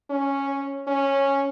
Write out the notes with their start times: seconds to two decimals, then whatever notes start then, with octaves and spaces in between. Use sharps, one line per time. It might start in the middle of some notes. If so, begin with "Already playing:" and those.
0.10 C#4
0.88 C#4